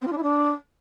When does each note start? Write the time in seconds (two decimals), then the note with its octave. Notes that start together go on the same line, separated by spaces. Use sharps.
0.01 C4
0.07 F4
0.12 D4
0.17 E4
0.22 D4